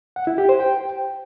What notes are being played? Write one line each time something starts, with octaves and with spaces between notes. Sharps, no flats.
F#5
E4
G4
C5
G5